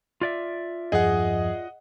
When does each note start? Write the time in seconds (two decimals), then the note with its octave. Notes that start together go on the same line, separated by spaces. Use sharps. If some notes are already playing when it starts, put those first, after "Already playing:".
0.21 F4 D5 E5
0.92 E2 G2 F3 G#4 D#5 F#5